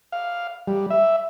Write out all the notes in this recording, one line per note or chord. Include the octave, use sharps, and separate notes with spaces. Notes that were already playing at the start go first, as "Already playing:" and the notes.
F5
G3
E5